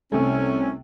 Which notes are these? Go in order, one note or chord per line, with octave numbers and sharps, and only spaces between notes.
C2 C3 A3 C#4